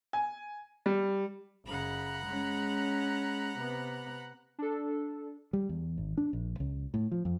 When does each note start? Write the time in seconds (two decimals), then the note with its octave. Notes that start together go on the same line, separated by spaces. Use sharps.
0.13 G#5
0.86 G3
1.65 F#1 C#3 F#5 A#5 B5
2.26 G#3 C#4
3.57 C3 B3
4.59 D4 A4
5.53 G3
5.69 E2
5.98 G#1
6.18 D4
6.33 A#1
6.60 C#2
6.94 A2
7.12 F3
7.25 F2